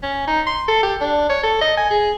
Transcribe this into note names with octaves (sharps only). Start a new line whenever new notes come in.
C#4
D#4
C6
A4
G4
D4
C#5
A4
D#5
G#5
G#4